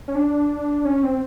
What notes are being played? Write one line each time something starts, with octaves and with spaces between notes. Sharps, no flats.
C#4
D4
C#4
C4